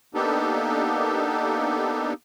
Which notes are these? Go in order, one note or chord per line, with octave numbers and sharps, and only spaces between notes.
A#3 B3 D4 D#4 G4 A4